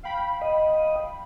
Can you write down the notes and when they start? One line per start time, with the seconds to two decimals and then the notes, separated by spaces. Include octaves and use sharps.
0.03 F5 G5 B5
0.42 D#5